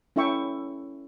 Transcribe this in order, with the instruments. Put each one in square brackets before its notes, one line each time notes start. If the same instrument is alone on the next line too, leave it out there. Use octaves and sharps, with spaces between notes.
[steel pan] C#4 E4 A4 E5 G5 C#6